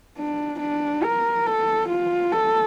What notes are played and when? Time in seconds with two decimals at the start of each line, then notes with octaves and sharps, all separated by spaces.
0.18 D4
0.61 D4
1.03 A#4
1.46 A4
1.89 F4
2.32 A4